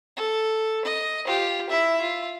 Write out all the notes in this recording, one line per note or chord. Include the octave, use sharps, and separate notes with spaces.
A4
D#5
F4 G4
E4 E5
F4